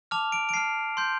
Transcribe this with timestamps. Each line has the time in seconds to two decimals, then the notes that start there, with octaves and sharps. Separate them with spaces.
0.11 A5 D6 F6 F7
0.32 D7
0.49 D7
0.54 A5 F6 C7
0.97 C6 G6